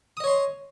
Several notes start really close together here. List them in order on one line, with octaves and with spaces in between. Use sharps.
D#6 D#5 C#5 C6